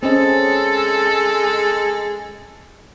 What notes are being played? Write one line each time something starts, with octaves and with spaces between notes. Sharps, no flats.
G#3 C4 C#4 A4 D#5